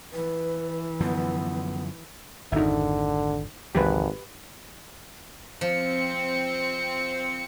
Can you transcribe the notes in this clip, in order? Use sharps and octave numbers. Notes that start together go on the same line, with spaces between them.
E3 B4
F#2 D3 F3 B3
G#1 F2 D3 D#4 E5
G#1 C#2 E3 F#3 G4 B4
F3 C4 C#7